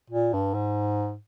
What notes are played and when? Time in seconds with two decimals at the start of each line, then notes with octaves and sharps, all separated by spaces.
0.10 A#2
0.33 G2
0.54 G#2